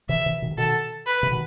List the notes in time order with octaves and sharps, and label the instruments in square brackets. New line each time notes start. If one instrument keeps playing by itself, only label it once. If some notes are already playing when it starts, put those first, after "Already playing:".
[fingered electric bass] C3 E3 [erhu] E5
[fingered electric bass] C3 E3
B2 D#3
C3
[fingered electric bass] B2 D#3 [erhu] A4
[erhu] B4
[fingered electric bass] C3
B2 D#3